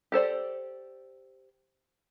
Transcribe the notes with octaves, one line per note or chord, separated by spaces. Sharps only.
G4 A4 C5 D5